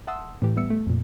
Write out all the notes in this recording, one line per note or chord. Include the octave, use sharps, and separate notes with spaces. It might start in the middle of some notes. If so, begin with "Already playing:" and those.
E5 F#5 A5 C6 D#6 E6
A2 E3 G4
G3 B3 E5 E6 C#7
A3
F2 A#2